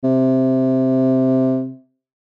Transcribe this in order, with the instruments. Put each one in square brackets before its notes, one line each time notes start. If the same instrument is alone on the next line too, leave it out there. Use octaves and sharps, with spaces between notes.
[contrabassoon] C3